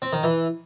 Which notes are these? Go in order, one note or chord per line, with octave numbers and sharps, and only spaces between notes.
C4
D#3
E3